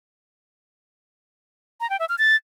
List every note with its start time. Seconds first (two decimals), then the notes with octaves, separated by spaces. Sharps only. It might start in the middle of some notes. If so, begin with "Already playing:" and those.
1.81 A#5
1.90 G5
2.00 E5
2.09 F6
2.18 A6